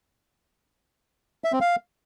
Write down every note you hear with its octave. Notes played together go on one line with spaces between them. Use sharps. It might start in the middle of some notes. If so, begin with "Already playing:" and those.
E5
C4
F5